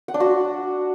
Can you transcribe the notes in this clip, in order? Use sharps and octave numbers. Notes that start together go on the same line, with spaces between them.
F#5
D4
F#4